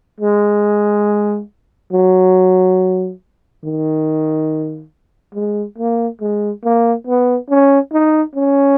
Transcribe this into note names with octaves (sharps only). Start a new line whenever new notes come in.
G#3
F#3
D#3
G#3
A#3
G#3
A#3
B3
C#4
D#4
C#4